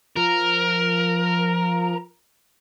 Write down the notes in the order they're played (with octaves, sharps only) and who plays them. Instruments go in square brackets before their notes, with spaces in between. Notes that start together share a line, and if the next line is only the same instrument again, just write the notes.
[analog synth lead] F3 [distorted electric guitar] A#4